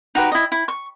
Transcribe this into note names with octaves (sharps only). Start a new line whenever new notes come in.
D#4 F#4 G4 B4
E4 D#5
E4
C#6